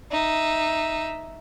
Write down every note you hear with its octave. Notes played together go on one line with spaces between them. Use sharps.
D#4 E5